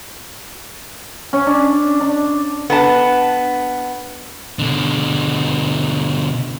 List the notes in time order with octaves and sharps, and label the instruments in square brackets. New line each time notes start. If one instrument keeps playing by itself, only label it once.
[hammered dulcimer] C#4
D4
D4
[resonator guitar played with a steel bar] B3 D4 A5
[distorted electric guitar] B2 D3